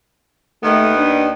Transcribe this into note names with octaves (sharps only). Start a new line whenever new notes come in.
D#2 D#3 A3 B3
D4